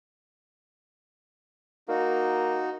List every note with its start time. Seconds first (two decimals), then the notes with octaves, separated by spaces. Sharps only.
1.89 A#3 D#4 F#4